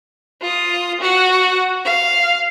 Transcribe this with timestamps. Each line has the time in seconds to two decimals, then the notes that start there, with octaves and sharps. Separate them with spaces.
0.42 F4 D#6
1.00 F#4 F#5
1.85 F5